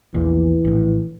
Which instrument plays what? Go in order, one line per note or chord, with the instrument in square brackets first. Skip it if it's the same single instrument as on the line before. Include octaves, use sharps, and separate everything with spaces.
[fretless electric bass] A#1 E2 A#2 [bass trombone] E3
[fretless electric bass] A#1 A2